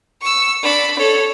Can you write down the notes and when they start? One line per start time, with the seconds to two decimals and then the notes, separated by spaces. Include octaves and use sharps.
0.22 C#6 E6
0.63 D4 B5
0.99 A4 C#5